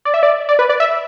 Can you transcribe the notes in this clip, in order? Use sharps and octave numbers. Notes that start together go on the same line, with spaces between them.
D5
E5
D5
D5
B4
D5
E5